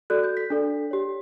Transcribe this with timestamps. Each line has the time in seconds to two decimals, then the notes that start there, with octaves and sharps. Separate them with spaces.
0.10 F#4 A4 D5 F#6
0.24 G6
0.37 B6
0.50 D4 A4 D5
0.91 G4 C#5